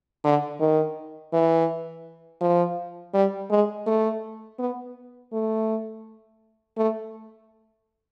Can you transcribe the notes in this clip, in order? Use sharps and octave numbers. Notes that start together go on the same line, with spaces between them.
D3
D#3
E3
F3
G3
G#3
A3
B3
A3
A3